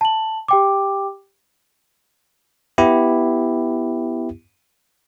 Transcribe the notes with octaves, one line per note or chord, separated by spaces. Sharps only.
A5 F#7
G4 G5 D6
B3 E4 G4